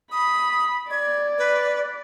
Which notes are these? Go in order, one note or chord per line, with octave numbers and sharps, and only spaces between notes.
B5 D#6
D5 G#6
B4